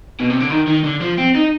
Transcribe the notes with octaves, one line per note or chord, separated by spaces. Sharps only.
B2
C3
D3
D#3
D#3
D3
F3
C4
D#4